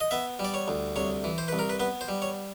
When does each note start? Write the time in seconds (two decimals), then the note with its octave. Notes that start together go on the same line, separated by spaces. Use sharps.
0.01 D#5
0.11 B3 E5
0.39 G3
0.45 D5
0.54 C#5
0.68 D2
0.96 C2 C#5
1.24 E3
1.38 C5
1.48 C2 B4
1.59 A#4
1.69 B4
1.80 B3 B4
2.01 C5
2.08 G3
2.22 C#5